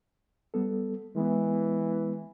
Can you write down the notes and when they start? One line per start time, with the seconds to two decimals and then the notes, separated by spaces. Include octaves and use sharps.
0.54 G3 B3 A4
1.16 E3 G#3 B3